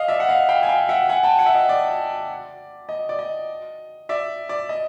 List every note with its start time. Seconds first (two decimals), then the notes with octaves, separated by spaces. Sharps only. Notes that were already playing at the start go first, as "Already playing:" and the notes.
Already playing: D#5 F5
0.08 D5 E5
0.20 F#5
0.29 D#5 F5
0.49 F5 G5
0.63 G#5
0.69 F5 G5
0.89 E5 F#5
1.09 F#5 G#5
1.23 G5 A5
1.39 F#5 G#5
1.46 E5
1.54 D#5
1.69 D5
2.89 D#5
3.09 D5
3.19 D#5
4.09 D5 E5
4.49 D5
4.69 D#5